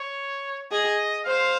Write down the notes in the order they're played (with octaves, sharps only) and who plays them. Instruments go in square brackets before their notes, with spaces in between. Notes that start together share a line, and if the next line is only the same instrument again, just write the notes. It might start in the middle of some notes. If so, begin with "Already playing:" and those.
Already playing: [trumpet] C#5
[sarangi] G#4 [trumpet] D#5
[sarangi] C5 [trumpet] F5